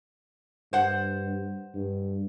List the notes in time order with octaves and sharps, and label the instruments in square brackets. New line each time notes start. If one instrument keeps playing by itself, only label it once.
[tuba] G2 [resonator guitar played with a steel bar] C5 F#5
[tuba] G2